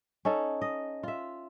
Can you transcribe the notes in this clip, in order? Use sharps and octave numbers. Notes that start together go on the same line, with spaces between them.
C#4 D#4 A4
D#5
F4 E5